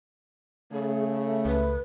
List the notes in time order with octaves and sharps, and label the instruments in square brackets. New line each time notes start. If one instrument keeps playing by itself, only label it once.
[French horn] C#3 [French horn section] A3 [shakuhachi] G#4
[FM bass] C#2 [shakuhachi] B4